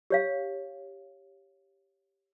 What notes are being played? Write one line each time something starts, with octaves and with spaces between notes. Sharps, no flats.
G4 C#5 F5